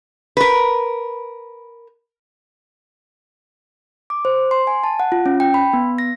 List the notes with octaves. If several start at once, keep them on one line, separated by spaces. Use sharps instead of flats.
A#4 B4
D6
C5
C6
G#5
A5
F#5
F4
C#4
G5
B5
B3
A#6